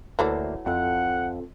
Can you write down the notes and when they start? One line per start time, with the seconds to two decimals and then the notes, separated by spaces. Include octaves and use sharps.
0.19 D2 E3 F#3 A3 A#3 C5
0.66 F2 C4 F4 A4 F#5